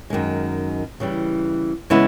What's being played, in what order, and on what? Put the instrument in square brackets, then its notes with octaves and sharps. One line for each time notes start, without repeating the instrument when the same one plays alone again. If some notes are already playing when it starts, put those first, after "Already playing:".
[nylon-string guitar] F#2 D#3 G#3
C#3 E3 G3
C#3 E3 G#3 B3 E4